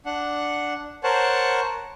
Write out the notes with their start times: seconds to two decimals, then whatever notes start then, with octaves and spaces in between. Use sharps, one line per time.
0.06 D4 F#5
1.03 A#4 C5 C#5 F#5 A5